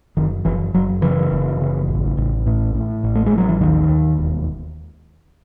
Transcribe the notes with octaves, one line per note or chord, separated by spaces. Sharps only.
F#1 D#3
F#1 E3
F#1 F#3
C#3 E3
F#1
C#3
A1
A1
A2
A2
A1
A3
G#3
A1
F#3
E3
D#2 D#3
D#2
E1